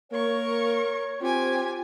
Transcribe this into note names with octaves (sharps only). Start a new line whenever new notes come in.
A#3 A#4 C#5 C#6
C4 F4 G4 G#5